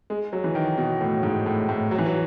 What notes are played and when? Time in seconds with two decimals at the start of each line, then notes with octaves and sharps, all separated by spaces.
0.10 G#3
0.33 F#3
0.44 E3
0.55 D#3
0.78 B2
1.01 A2
1.23 G#2
1.46 A2
1.69 A2
1.91 F#3
1.98 E3
2.06 F#3